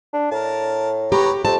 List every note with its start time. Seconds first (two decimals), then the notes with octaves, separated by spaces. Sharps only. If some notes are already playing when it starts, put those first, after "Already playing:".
0.13 D4
0.32 A2 A#4 A5
1.12 B3 G4 C#5 A#5
1.45 F2 C4 A5